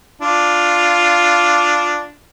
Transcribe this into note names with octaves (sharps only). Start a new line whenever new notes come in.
D4 F4